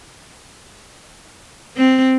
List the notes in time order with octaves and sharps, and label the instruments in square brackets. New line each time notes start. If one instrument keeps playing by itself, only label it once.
[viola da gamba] C4